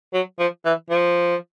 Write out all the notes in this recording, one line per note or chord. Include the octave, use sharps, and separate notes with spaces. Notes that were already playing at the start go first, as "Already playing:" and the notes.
F#3
F3
E3
F3